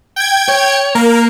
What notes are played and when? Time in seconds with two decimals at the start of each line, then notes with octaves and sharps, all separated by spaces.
0.16 G5 G#6
0.48 C#5
0.95 A#3 A#4